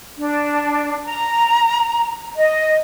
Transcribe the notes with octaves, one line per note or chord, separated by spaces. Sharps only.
D4
A#5
D#5